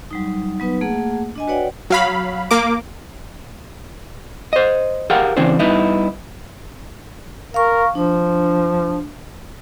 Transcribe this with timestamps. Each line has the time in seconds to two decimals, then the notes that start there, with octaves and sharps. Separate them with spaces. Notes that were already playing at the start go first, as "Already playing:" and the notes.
0.11 F#3 G3 D#4
0.60 F#3 B3 D#4 B4
0.81 A3 A#3 G#4 F#5
1.35 D4 D#5 G#5
1.47 F#4 B4 C#5 D5 F#5 G5
1.90 F#3 F5 B5
2.51 A#3 D6
4.53 C5 D#5
5.10 G4 G#4 A#4 F5 F#5
5.37 C#3 E3 C4 D4 C5
5.59 G2 B3 D#4 E4
7.54 A#4 F5 C#6
7.95 F3 D4